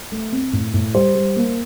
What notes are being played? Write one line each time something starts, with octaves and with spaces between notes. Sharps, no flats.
A3
C4
A2
A2
G3 C5
G3
A#3